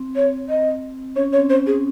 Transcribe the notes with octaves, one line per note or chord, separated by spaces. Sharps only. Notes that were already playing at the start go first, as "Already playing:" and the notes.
Already playing: C4
C#5
D#5
C#4 C#5
C#5
C4
C5
G#4